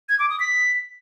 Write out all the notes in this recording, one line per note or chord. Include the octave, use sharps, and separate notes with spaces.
G#6
D6
D#6
B6